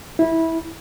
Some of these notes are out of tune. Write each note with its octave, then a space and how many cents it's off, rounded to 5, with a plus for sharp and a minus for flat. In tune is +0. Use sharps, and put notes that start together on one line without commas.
E4 -15